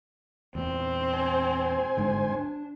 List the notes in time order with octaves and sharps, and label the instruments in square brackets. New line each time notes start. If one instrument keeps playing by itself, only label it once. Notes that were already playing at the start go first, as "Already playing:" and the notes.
[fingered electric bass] E2 A#2 [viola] C4
[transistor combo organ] C5 G#5
[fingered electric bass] G1 G#2 D3
C#4 D4